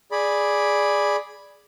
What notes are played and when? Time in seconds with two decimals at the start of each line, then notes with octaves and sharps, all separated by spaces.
0.11 G#4 D5 B5